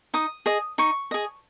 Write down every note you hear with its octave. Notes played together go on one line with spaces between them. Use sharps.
D#4 D#6
G#4 D#5
D#4 C#6
G#4 D#5